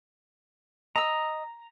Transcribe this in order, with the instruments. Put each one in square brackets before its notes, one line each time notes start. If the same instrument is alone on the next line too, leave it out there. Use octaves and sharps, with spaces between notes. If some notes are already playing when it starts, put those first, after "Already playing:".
[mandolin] D#5 E6 [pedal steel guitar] A#5